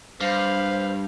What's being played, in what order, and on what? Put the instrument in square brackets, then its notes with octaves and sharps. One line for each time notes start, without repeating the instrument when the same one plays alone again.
[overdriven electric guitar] G2 [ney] C5 [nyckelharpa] F5 B5